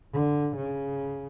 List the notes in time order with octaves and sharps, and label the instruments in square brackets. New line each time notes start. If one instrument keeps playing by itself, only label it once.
[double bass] D3
C#3